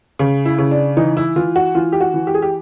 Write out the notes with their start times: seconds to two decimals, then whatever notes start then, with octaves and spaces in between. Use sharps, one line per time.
0.19 C#3
0.45 E4
0.58 C#3
0.71 D4
0.97 E3 D#4
1.17 E4
1.36 E3 F4
1.56 F#4
1.75 E3 F4
1.92 G4
2.01 F#4
2.14 E3
2.27 G4
2.34 G#4
2.42 G4